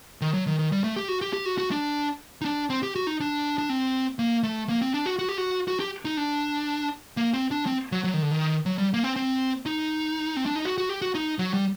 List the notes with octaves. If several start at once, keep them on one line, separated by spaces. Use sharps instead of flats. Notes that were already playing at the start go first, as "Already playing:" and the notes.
D#3
F#3
D#3
D#3
G3
A3
G4
F#4
G4
G4
F#4
F#4
D4
D#4
D4
C4
G4
F#4
D#4
D4
D4
C4
A#3
A3
A#3
C4
D4
F#4
F#4
G4
F#4
F#4
G4
D#4
D4
A#3
C4
D4
C4
F#3
F#3
D#3
D3
D#3
F#3
G3
A#3
C4
C4
D#4
C4
D4
D#4
F#4
F#4
G4
F#4
D#4
F#3
G3